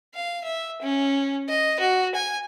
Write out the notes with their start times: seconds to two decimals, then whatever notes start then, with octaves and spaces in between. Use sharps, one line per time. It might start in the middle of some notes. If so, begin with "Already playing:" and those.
0.15 F5
0.44 E5
0.82 C#4
1.49 D#5
1.80 F#4
2.15 G#5